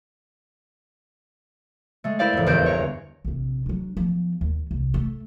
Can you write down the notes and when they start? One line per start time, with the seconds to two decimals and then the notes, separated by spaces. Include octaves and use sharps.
2.04 G#3 A3
2.19 E4 A#4 C5 D5 F5
2.33 A1 F2
2.46 G1 E2 A#4 C5 G6 D7
2.66 C#5 A#5
3.25 A#1 C3
3.66 F#3 D4
3.97 F3 B3
4.41 D#2
4.71 C2
4.94 A3